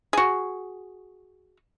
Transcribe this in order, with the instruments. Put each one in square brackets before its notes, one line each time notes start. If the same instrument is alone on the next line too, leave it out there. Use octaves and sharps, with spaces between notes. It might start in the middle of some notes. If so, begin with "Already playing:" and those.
[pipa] F#4 G#4